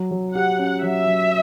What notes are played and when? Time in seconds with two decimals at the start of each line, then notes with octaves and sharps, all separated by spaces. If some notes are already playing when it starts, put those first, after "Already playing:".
Already playing: F#3
0.11 F#3
0.35 G4 F#5
0.58 C#4
0.83 F#3 E5
1.06 F#3